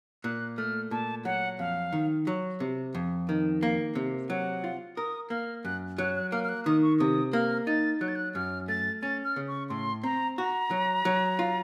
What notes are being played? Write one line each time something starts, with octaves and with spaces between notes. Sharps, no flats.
A#2 F#6
A3 F6
A#2 A5
F#3 F#5
F2 F5
D#3
F#3
C3
F2
D#3
A#3
C3
F#3 F#5
F4
A#4 D#6
A#3 F6
F#2 F#6
F#3 F#6
F#6
A#3 F6
F6
F#6
D#3 D#6
C#6
C3 D#6
A#3 F6
D#4 A6
F#3 F#6
A6
F#6
F#2 F6
A3 A6
C#4 A6
F6
C#3
C#6
A2 C6
C4 A#5
F#4 A#5
F#3
F#3
F4